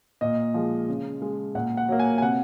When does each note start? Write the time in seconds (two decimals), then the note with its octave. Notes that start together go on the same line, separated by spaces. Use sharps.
0.21 A#2 D#5
0.54 F3 G#3
0.88 C#3
1.22 G#3
1.55 A#2 F#5
1.77 F#5
1.88 F#3 A#3
1.99 G#5
2.18 G#5
2.22 C3 F#5